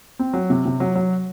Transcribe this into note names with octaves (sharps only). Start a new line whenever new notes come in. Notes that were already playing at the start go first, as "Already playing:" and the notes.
C4
F#3
C3
C3
F#3
F#3